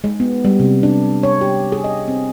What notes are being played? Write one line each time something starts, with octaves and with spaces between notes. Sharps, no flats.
G#3
B3
G3
C3
D4
C#5
G4
G#4
D#5
C4